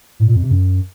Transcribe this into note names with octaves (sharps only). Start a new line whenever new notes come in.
A2
A#2
F2
C3
F#2